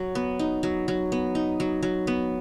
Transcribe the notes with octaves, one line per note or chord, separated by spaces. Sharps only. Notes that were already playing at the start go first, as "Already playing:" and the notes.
Already playing: F#3
B3
D#4
F#3
F#3
B3
D#4
F#3
F#3
B3